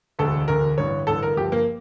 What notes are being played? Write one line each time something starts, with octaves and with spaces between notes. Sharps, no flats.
E1 D2 D3 A3 A4
E1 D2 D3 A3 A#4
A1 G2 D3 C#5
A1 G2 D3 A4
A#4
G1 G2 F3 G4
A#3